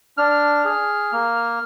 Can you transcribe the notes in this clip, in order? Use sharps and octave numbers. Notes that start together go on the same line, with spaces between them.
D4 F6
G#4
A#3